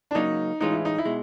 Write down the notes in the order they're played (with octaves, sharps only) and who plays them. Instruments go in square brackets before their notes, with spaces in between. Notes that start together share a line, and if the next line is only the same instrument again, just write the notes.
[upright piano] D4
[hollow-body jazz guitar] C#2 C#3 F#3 A#3 [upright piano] D#4
[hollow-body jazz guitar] A2 E3 G#3 C#4 F4 [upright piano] D#4
[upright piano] E4
D#4
E4
[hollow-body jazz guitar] B2 G#3